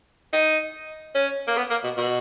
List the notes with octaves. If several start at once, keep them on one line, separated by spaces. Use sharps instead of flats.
D#4
C#4
A#3
B3
A#3
B2
B2